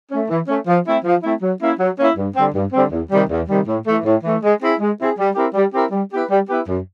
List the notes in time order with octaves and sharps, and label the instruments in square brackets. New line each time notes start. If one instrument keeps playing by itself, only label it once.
[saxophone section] A3 C#4
E3
A3 C#4
F3
A3 C4 E4
F3
A3 C4 E4
F#3
A#3 C#4 E4
F#3
A#3 C#4 E4
G2
D3 G3 C4
G2
D3 G3 C4
E2
C3 D#3 G3
E2
C3 D#3 G3
A2
E3 A3
A2
E3 A3
G#3
C4 E4 G#4
G#3
C4 E4 G#4
G3
C4 E4 G4 A#4
G3
C4 E4 G4 A#4
G3
B3 E4 G4 B4
G3
B3 E4 G4 B4
F#2